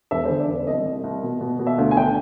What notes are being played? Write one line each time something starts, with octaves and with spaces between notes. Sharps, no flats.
E1 E5
D3 C5
D5
E1
D5
C2 D#5
C2
C2
B2
B2
B2
E5
D2 F5
G#5
D3 G5